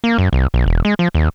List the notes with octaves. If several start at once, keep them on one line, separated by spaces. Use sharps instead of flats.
A#3
F#2
C2
B1
E1
G#3
F3
D#2